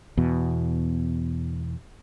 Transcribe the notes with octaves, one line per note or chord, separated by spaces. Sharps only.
E2 B2